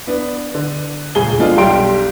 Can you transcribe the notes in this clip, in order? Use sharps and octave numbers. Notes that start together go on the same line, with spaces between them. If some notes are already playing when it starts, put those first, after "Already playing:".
B3 D4
D3
D#1 C#2 G#4 G7
B2 F3 G#3 D4 F4 A4
B1 G3 G4 C6 D7